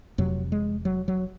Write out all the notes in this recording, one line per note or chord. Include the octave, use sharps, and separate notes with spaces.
F1 F2 C3 F#3
G#3
F#3
F#3